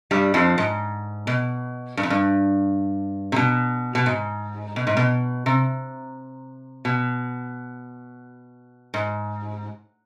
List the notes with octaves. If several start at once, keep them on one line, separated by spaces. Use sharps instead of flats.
G2 G3
F2 F3
G#2
B2
G2
F2
G2
C3
B2
B2
G#2
B2
G#2
B2
C3
B2
G#2